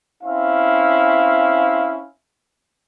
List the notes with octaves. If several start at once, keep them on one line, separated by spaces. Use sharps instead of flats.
C4 C#4 E4 F5